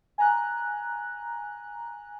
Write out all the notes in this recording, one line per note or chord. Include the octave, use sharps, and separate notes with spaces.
G#5 A#5 F#6